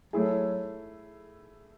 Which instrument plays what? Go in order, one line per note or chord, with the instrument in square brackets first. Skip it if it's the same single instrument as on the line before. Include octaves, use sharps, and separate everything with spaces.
[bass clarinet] F#3 [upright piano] A3 E4 G#4